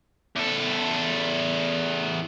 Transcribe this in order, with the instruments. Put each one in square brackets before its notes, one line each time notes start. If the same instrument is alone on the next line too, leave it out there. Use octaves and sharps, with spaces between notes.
[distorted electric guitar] E2 A4